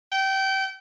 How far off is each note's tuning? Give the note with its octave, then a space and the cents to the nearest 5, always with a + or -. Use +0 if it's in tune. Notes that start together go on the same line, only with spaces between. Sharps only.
G5 -25